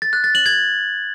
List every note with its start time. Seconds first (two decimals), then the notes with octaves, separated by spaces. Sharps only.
0.02 A6
0.13 F#6
0.24 A6
0.35 F#7
0.46 G#6